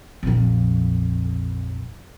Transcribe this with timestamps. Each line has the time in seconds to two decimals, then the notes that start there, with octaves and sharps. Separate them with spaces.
0.23 A#1 F2